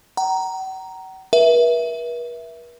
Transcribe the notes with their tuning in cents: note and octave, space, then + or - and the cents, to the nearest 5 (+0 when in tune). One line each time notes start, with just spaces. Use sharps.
F#5 +45 A#5 +0
B4 -45 E5 +0